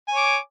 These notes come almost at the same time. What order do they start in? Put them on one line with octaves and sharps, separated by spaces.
G#5 C#5 D6